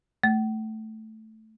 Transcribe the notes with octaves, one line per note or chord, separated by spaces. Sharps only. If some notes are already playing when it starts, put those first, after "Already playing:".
A3